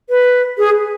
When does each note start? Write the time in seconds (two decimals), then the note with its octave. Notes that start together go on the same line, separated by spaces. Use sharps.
0.10 B4
0.58 G#4